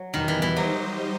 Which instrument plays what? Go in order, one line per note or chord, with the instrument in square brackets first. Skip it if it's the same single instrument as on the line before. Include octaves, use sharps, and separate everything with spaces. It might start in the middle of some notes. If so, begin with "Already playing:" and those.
Already playing: [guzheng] F#3
[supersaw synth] E2 B2 G3 [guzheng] D#3
[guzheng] E3
E3
[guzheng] F#3 [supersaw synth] G3 D#4 G4 C5 D#5